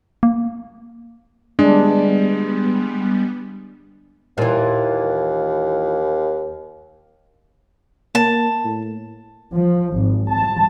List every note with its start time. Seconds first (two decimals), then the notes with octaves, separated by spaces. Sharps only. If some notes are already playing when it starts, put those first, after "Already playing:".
0.23 A#3
1.59 G3 G#3 B3 D4
4.38 D#2 A#2 E3
8.15 A#3 A5
8.65 A2
9.54 F3
9.96 G#1
10.32 A5